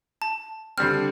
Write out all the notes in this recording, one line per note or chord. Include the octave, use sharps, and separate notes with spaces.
A5
D3 G3 C4 F6